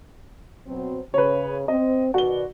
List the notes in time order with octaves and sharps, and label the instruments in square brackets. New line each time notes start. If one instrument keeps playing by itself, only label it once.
[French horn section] B2 F#3 C4
[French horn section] C#3 [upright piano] B4 C#5
[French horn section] C4 [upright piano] D#5
[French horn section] B2 D#3 D5 [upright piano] F#4 G7